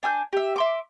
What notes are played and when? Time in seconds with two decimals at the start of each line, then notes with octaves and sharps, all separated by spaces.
0.03 D4 G#5 E6 G6
0.33 G4 E5
0.56 E5 C6 D6